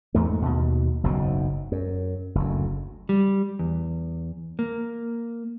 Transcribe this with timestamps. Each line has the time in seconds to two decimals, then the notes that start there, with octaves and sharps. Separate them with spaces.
0.15 E2 G#2 A3
0.42 D#2 B2
1.03 F#1 B1 G#2 B2
1.72 F#2
2.35 F#1 D2
3.09 G3
3.59 E2
4.59 A#3